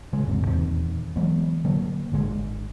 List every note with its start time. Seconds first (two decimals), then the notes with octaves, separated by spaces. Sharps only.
0.13 C#3 G#3
0.27 G#1 E2 G#2 C3
0.46 D#1 E2 D#3 C4
1.16 E3 F#3 G#3 B3
1.65 D3 F#3 A#3
2.12 G#1 D3 G#3